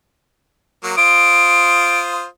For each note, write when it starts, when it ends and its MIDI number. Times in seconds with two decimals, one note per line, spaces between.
0.84 0.97 54
0.84 0.97 58
0.97 2.25 65
0.97 2.25 72
0.97 2.25 87
0.97 1.99 98